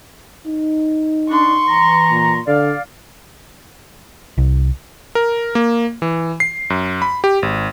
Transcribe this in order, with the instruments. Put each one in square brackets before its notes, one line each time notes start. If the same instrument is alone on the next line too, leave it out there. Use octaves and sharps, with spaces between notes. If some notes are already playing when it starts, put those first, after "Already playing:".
[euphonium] D#4
[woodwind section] D4 [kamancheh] C6 C#6
[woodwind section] E3 A#5
[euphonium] A#2
[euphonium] D3 [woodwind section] D5 F5
[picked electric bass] C2
[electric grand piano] A#4
A#3
E3
C7
F#2
B5
G4
G#1